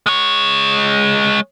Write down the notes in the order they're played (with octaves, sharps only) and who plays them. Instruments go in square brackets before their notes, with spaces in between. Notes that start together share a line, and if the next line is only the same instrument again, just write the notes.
[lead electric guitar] G#3 C#5